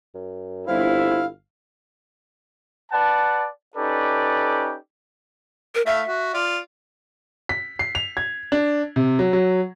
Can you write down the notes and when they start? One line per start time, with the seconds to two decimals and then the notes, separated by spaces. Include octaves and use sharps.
0.15 F#2
0.68 G1 C4 E4 F5
2.92 B4 D5 F#5 A5
3.76 C#4 D#4 G4 A4 B4 D5
5.75 A#4
5.86 A3 E4 E5 F5
6.07 F#4
6.34 F4 D5
7.49 B6
7.79 C7
7.95 F7
8.17 G#6
8.52 D4
8.96 C3
9.19 F#3
9.33 F#3